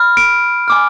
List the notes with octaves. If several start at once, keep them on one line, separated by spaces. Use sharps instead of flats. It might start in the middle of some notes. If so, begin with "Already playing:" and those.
Already playing: B5 F6
D7
G#5 D6 F6